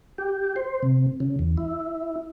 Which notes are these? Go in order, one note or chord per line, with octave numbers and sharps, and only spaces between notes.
G4
C5
C3
C#3
E2
E4